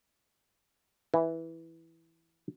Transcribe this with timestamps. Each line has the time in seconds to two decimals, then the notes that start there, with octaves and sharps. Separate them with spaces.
1.14 E3